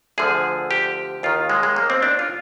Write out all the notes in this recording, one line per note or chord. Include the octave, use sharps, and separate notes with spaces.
D2 D3 F3 G#4
G4
D#2 D#3 F4
G#3
G#3
A#3
C4
D4
F4